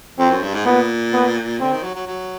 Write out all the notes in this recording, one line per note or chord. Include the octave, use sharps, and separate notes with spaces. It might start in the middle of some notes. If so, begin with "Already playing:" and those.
F2 C4
F#2
G2
G#2
A#2 B3
B3
D3 C4
D#3
F#3
F#3
F#3